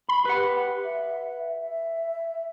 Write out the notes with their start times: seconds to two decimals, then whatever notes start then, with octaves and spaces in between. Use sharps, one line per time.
0.09 B5
0.25 G4 B4 F#5
0.84 E5
1.61 E5